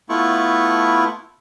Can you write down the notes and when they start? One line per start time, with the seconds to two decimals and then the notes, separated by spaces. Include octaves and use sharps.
0.09 A3 B3 E4 F4 C#6